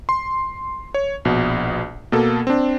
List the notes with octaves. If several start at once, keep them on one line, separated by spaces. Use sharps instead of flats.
C6
C#5
A#1 B2
B2 A#3 A4
C4 D4